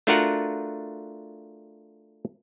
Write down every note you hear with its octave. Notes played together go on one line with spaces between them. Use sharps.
A3 D4 F4 F#4 A#4 F#5